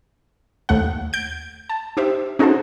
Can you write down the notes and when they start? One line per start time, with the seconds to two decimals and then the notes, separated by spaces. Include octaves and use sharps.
0.69 D#2 A3 F#5
1.13 G6 D7
1.69 A5
1.97 D#4 G4 C5 E5
2.39 C#4 D#4 F#4 G#4 A4 C5